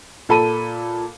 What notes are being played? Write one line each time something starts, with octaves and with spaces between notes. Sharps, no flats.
A#2 A4 B5 D#7